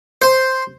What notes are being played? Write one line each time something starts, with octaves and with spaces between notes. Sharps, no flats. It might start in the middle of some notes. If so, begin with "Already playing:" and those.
C5